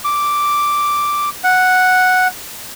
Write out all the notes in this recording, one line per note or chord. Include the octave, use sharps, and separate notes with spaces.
D6
F#5